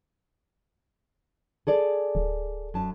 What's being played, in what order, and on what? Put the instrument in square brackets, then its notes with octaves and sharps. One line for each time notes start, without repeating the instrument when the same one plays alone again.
[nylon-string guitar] G#4 A4 D5
[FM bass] D1
[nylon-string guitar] F#2 A5